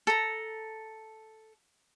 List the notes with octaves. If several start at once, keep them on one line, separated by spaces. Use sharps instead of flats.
A4 A#5